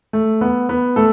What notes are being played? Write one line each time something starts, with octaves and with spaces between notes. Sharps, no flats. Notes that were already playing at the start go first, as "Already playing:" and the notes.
A3
B3
B3
A3 A4